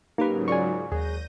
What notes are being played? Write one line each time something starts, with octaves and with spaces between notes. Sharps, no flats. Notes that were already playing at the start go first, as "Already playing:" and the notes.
G#2 C#3 F#3 A#3 D#4 G4 A#4 B4
F4 G#4 A#4 D5 G#5 C#6
D#2 F#3 G#4 G6 A#6 D#7